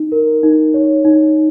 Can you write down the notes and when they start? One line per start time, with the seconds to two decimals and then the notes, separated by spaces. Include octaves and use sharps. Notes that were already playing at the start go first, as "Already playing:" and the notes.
Already playing: D#4
0.12 A#4
0.43 D#4
0.74 C#5
1.05 D#4